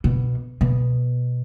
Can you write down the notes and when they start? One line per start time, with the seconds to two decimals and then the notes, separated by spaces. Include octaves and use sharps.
0.04 B2
0.61 B2